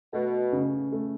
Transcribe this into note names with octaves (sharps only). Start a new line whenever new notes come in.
B2 A3
C#3
A3